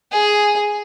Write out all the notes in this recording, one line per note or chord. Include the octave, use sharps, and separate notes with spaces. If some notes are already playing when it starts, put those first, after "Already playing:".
G#4